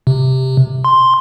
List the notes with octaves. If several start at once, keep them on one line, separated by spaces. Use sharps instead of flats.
C3
C6